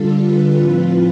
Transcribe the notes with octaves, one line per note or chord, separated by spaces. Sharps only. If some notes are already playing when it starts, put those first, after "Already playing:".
Already playing: D3 G3 D4 F4 A4
B4
A2 F3 C4 F4 B4